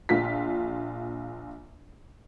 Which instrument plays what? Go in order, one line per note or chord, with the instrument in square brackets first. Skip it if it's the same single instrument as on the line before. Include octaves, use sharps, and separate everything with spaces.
[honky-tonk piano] A#1 F4 B6